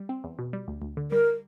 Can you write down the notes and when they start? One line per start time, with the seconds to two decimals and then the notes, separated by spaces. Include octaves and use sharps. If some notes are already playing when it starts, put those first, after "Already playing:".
Already playing: G3
0.09 C4
0.24 E2
0.39 B2
0.53 G3
0.68 D2
0.82 D2
0.97 D3
1.11 G3 A#4